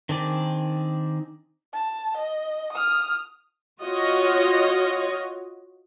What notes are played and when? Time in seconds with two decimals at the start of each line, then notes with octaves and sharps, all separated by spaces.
0.09 D#3 C4 D4 G#4 D5
1.73 A5
2.17 D#5
2.73 D#6 F6
3.82 F4 F#4 C#5 D#5